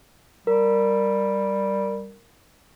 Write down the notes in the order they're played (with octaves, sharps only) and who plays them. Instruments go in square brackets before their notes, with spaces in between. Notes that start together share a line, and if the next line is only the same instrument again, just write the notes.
[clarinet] G3 [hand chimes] A#4